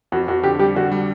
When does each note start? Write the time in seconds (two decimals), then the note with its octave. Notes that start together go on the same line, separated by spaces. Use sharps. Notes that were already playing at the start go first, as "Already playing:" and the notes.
0.12 F2 F#4
0.28 F2 F#4
0.44 D3 G4
0.59 G3 G4
0.76 D3 F#4
0.92 G3